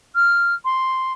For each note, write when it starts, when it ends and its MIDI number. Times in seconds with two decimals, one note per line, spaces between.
0.15 0.55 89
0.65 1.13 84